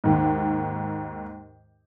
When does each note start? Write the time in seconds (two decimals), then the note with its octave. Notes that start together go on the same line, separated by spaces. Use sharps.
0.04 D#2 G#2